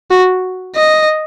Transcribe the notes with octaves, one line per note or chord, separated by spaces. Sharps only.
F#4
D#5